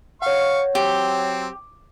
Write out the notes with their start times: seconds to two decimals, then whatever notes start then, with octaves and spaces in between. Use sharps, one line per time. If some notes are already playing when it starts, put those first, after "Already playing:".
0.22 C#5 F5 F#5 C#6
0.75 F#3 C4 G4